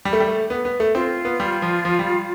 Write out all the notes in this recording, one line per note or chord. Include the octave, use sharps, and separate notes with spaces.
G3
A3
G3
A3
B3
B3
A3
C4 F4
B3
G3
F3
F3
G3